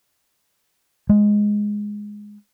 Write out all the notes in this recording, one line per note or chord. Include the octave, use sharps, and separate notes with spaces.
G#3